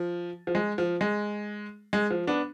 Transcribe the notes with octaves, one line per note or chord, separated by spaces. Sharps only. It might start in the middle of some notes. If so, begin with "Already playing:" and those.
Already playing: F3
F3
G#3
F3
G#3
G#3
F3
B3 D4